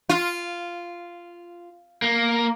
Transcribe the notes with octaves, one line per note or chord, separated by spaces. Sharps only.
F4
A#3